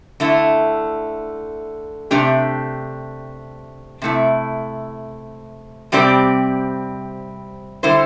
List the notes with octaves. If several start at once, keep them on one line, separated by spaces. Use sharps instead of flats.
D3 A3 E4
C3 A3 D4 G4
C3 A3 E4
C3 G3 C4 G4 D5
D3 G3 E4 C5